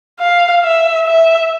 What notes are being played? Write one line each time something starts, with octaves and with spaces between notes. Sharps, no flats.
F5
E5
E5